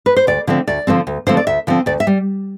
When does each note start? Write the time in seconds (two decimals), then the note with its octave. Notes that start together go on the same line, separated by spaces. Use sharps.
0.06 B4
0.16 C5
0.27 D2 D5
0.47 D3 F3 A3 C4
0.67 D2 D5
0.87 D3 F3 A3 C4
1.07 D2
1.27 D3 F3 A3 C4 C5
1.37 D5
1.47 D2 E5
1.67 D3 F3 A3 C4
1.86 D2 D5
2.00 E5
2.07 G3